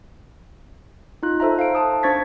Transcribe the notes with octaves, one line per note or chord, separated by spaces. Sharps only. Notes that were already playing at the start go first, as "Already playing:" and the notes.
D#4 F4 F#6
A4 C5 E5 A#5
F5 D7
A5 D#6
D4 C5 C#6 G#6 A6 B6